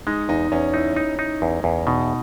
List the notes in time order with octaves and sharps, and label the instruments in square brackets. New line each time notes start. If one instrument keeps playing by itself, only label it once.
[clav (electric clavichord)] G#3 [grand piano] D#4
[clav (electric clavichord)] E2 [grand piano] D#4
[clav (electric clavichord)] E2 [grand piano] C#4
[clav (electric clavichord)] D#4 [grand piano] E4
[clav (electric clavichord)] D#4
D#4
E2
E2
[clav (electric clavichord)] B2 [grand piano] D#4